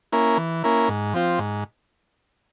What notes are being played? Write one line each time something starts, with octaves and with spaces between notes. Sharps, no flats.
A#3 C#4 E4 A#4
E3
A#3 C#4 E4 A#4
G#2
F3 C4 F4
G#2